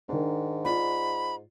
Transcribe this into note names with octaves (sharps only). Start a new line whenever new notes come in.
G#2 D#3 D4
F4 D5 B5